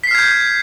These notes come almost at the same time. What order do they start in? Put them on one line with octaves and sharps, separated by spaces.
B6 C7 F6 G#6 G6